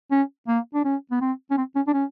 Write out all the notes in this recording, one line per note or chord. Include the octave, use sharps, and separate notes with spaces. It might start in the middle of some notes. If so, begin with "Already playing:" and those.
C#4
A#3
D4
C#4
B3
C4
C#4
C4
C#4
D4
C#4